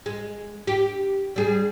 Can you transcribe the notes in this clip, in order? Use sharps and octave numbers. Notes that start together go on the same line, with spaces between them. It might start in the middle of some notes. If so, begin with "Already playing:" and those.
G#3
G4
G3 G#4